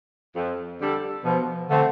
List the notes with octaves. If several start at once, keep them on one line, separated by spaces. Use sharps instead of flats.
F2
D3 G3 D4 A4
B2 F3
D3 A3 C4